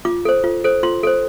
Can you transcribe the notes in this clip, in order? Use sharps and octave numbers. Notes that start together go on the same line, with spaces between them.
F4 D6
A4 C5
F4
A4 C5
F4 C6
A4 C5